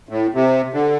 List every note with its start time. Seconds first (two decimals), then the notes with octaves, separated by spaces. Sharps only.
0.09 A2
0.34 C3
0.73 D3